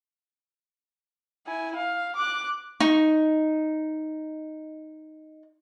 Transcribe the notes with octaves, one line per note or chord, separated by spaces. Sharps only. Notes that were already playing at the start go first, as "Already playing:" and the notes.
E4 G#5
F5
D6 F#6
D#4 C#6